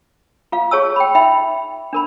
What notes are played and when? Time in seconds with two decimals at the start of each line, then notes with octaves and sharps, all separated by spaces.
0.52 F4 F5
0.71 G#4 C#5 A5 E6
0.96 G5 B5
1.15 D#4 E5 G5 B5
1.93 D4 A#4 B5